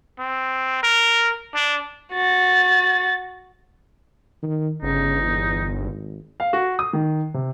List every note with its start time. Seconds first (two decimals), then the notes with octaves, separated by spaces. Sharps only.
0.19 C4
0.83 A#4
1.54 D4
2.12 F#4 A6
4.42 D#3
4.82 G1 C#3 D#4
5.22 E2
5.79 G#1
6.40 F5
6.53 F#4
6.79 D#6
6.93 D#3
7.34 C3